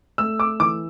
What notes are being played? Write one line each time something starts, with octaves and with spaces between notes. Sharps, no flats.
A3 E6
D6
E3 D6